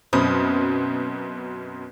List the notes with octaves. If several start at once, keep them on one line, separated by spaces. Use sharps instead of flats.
F#2 B2 C4 C#4 B5 D#6